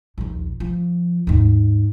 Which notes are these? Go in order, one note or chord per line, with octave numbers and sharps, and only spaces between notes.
A#1 D#2
F3
D#2 G#2